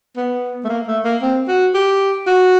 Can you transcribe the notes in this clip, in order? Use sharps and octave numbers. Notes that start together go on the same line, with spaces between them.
B3
A3
A#3
A3
A#3
C4
F#4
G4
F#4